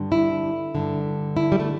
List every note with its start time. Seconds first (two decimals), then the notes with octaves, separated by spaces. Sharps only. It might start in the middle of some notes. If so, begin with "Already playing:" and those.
Already playing: G2 D3
0.12 E4
0.75 G2 D3
1.37 E4
1.52 G3
1.60 A3